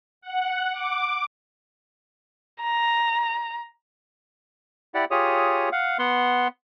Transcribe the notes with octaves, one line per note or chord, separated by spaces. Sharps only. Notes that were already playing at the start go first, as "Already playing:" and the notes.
F#5
D6
A#5
E4 G4 D5 F#5
F4 G4 G#4 C#5 D#6
F5 F#5
B3 F#5 C6